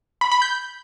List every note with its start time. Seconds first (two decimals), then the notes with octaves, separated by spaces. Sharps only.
0.21 B5
0.32 B5
0.42 G6